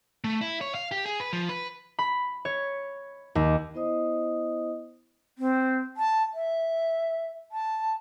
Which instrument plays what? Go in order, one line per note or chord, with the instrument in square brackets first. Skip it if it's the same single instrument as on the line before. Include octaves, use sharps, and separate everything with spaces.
[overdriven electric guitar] A3
E4
C#5
F5
G4
G#4
B4
F3
B4
[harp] B5
C#5
D#2
[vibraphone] B3 E4 C5 D#5 D#6
[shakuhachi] C4
A5
E5
A5